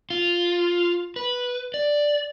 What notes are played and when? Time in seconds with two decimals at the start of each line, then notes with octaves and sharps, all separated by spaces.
0.10 F4
1.16 B4
1.74 D5